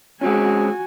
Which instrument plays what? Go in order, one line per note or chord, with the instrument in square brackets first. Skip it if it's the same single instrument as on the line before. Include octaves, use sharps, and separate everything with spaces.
[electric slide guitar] G#3 C4 C#4 [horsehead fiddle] F#4 G#5